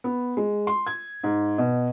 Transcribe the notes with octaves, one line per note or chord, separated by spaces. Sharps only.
B3
G#3
C6
G#6
G#2
B2